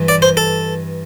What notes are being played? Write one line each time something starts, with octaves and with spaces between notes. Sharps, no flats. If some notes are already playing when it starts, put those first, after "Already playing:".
Already playing: G2 E3
D5
C5
A4